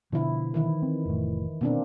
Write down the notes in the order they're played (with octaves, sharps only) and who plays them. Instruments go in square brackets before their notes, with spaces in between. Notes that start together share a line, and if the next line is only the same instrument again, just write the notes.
[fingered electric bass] B2 D3 [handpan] F3 E4
[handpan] D#3 E3 E4
[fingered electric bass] C4
F1 A2
[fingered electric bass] B2 [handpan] A#3 C4 D4